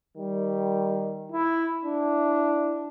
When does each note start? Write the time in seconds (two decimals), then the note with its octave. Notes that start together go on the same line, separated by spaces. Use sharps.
0.17 D#3 G3
1.32 E4
1.85 D4 E4